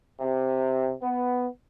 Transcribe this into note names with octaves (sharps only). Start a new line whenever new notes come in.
C3
B3